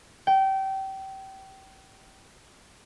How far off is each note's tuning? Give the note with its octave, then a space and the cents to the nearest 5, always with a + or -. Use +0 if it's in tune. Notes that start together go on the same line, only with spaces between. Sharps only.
G5 -25